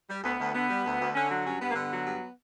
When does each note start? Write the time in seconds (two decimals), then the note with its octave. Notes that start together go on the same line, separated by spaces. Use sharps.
0.10 G3
0.24 D2 B3
0.39 D2
0.54 D3 B3
0.69 G3
0.85 D2
1.00 D2
1.15 D3 C#4
1.31 F#3
1.45 G2 C#4
1.60 G2 B3
1.71 A#3
1.75 D3 B3
1.91 F#3
2.05 G2